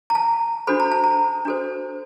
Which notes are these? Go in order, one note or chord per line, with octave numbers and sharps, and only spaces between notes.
A#5
A5
D4 F#4 A4 C5 B5
A#5
A5
A#5
D4 F#4 A4 C5